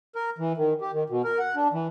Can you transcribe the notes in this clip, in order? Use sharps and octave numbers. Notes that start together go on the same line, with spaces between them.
A#4
E3
D#3
G4
D#3
B2
A#4
F#5
D4
E3